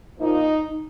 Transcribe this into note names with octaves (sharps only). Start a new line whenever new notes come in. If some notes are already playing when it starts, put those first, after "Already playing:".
A#2 F3 A#3 D#4